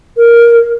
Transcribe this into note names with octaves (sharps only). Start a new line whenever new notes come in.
A#4